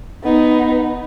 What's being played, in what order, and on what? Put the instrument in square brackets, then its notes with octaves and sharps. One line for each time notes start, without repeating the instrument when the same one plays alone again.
[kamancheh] B3 D#4